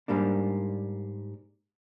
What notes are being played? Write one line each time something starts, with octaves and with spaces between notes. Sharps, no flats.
G#2 G3 A#3 D4